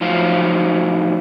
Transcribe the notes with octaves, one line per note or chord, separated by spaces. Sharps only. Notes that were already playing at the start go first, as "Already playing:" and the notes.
A2 F3 F#3 D#4 C5 F5